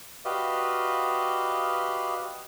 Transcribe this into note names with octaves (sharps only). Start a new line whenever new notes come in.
F#4 G4 B4 D5 D#5 F5